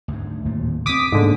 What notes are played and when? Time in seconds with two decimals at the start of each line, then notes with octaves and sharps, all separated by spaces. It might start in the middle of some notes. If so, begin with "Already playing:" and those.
0.08 D2 G#2
0.45 D1 D#2 A#2
0.86 D3 C4 D6 D#6 B6
1.12 G#2 B2 D3 G#3 A#3